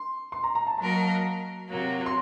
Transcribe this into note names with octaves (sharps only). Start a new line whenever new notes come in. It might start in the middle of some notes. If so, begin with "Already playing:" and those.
Already playing: C6
C6
A#5
A#5
A5
F#3 A#3 F#4 A#4 D#5 A5
C3 F#3 A#3
C6